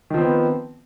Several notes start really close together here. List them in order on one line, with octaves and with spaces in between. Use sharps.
D#3 F3 C4 B3